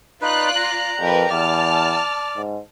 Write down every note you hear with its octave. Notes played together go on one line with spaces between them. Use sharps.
D#4 F4 B4 D5 F#6
A#5
F2 G4 A#4 B4
E2 D5 A5 F6
G#2